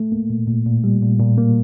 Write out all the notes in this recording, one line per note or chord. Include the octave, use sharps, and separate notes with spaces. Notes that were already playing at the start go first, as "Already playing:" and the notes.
Already playing: A3
A#3
A#2
A#2
A#2
G3
A#2
A#2
A#3